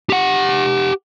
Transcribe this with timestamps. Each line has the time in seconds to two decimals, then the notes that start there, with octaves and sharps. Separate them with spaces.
0.10 G4 F#5